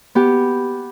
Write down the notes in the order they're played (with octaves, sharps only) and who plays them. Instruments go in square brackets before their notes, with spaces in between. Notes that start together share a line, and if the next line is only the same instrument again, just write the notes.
[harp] B3 G4